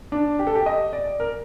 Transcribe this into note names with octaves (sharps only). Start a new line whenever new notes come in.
D4
G4
A4
G4
D#5
D5
A#4